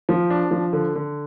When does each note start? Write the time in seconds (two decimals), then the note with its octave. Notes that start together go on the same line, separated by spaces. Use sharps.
0.09 F3
0.30 D4
0.51 F3
0.73 D3
0.95 D3